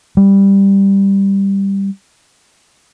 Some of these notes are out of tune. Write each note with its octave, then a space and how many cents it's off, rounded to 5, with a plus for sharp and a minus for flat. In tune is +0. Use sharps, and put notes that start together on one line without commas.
G3 +5